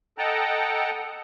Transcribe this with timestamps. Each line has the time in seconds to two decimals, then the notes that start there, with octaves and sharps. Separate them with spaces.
0.18 A4 D#5 F#5 G5 A5 A#5